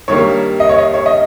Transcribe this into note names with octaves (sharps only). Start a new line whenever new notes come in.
G2 D#3 G3 A#3 C#5
D#5
C#5
D#5
C#5
D#5